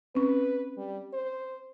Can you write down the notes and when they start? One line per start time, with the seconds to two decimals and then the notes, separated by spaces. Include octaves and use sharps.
0.15 C4 C#4 B4
0.77 G3
1.13 C5